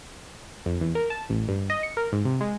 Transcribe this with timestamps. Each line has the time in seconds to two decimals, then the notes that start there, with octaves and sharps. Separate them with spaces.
0.66 F2
0.81 E2
0.95 A#4
1.10 A5
1.30 A1
1.48 G2
1.70 D#5
1.83 C#7
1.97 A#4
2.12 G#2
2.25 C3
2.41 G#3